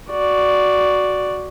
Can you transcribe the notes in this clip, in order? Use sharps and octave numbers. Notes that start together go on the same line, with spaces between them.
F#4 D5